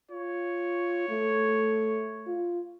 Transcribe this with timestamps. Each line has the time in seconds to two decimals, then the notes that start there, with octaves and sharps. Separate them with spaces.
0.11 F4 C#5
1.10 A3
2.27 F4